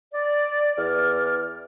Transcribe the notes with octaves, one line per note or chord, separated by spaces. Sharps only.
D5
E2 D5 F6